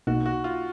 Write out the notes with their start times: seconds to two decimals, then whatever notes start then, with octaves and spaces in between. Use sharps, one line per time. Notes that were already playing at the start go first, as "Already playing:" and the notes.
0.07 B1 B2 A#3 D#4 F#4
0.26 F#4
0.44 F4